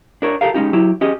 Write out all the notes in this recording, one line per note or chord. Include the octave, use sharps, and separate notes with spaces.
D4 A#4 C#5
G4 A4 A#4 F5
G#3 C#4 D#4 G4
F#3 E4 G4
C#4 G4 G#4 D#5